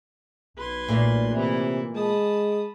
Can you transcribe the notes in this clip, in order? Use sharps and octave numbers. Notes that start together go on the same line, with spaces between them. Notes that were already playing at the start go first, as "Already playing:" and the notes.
B1 B4 C6 G#6
A#2 A3
C3 E3 E4
G#3 A5 B5 D#6